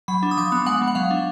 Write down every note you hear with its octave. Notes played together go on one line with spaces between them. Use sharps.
F#3 B5
D4
D#6
F3 D6
B3 D#6
G#3 F#5
B3
F#5
F#3 F5
D4